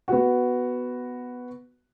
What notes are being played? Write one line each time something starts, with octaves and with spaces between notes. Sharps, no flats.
B3 F#4